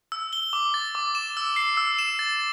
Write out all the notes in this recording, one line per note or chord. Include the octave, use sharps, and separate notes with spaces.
E6
G7
D6
A6
D6
E7
E6
C7
E6
E7
A6